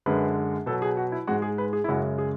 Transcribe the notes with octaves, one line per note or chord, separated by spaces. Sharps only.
F#2 D3 G#3 B4
B2 F#3 A4
G#4
F#4
E4
G#2 G#3 F#4
G#4
B4
G#4
E4
F#2 C#3 G#3 F#4
G#4